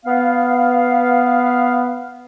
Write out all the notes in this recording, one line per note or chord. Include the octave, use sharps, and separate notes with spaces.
B3 F5